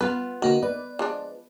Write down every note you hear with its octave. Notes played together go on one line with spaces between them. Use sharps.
B3 F4 B4
D3 D#3 A#3 F#4
B4 D5
F3 G#3 D4